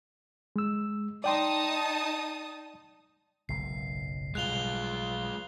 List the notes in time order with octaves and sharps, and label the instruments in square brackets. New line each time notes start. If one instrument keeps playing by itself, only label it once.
[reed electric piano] G#3 E6
[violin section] D#4 A5 D#6 [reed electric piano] D5 G5 C6
[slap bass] F#1 B1 G#2 [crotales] C7
[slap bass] B1 G3 [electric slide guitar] G#3 F4 [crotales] F#6 F7 G7